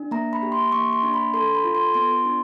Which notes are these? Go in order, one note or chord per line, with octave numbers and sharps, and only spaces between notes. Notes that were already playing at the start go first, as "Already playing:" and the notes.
Already playing: D4
A#3 A#5
B5
G4
C6
A#3 C#6
C6
D4
B5
A4 C6
B5
F4
C6
B3 C6
D4